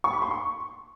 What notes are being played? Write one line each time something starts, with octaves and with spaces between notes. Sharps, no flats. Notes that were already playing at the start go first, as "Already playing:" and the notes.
C#6
B5
C6
C#6